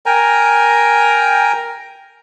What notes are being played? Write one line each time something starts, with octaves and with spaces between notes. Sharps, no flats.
A#4 G5 G#5 A#5